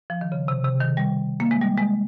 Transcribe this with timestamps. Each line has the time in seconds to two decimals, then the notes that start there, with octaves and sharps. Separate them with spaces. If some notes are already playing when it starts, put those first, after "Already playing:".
0.10 F3
0.21 D#3
0.32 C#3
0.48 C3
0.65 C3
0.81 D#3
0.97 G3
1.40 A#3
1.51 G#3
1.61 G3
1.77 G#3